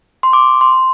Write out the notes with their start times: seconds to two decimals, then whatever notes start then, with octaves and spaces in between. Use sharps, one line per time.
0.23 C6
0.33 D6
0.61 C6